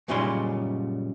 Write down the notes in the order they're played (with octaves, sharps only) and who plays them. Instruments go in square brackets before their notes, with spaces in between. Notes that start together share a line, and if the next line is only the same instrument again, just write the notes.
[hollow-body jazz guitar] F#2 A#2 C#3 G3 D#4 C6